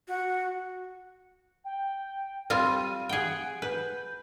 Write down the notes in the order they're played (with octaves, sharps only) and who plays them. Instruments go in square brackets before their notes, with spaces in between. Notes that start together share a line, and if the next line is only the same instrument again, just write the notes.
[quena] F#4
[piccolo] G5
[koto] G3 C4 F4 [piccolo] D#7
[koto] G#4 G5 [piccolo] F#5
[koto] B4 [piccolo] G6